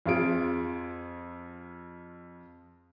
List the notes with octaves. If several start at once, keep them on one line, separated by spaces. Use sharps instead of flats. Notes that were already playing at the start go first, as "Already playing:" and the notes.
F2 F4 G#4 D7